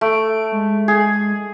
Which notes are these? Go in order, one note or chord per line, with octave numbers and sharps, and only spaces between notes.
A3 D7
G#3
G#4